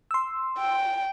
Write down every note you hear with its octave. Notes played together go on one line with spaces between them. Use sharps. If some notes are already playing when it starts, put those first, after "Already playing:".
C6 E6
G5